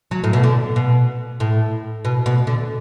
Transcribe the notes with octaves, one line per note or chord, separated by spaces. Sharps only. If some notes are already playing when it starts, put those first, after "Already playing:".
F#3
A2
B2
D3
B2
A2
B2
B2
D3